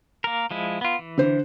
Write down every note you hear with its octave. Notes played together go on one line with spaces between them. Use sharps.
A#3 A#4
F3 G#3 E4
B3 F4
E3
D3 C5